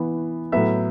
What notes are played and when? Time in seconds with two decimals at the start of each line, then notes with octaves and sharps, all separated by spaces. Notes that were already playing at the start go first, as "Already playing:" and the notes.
Already playing: E3 B3
0.52 A2 F#3 B3 E5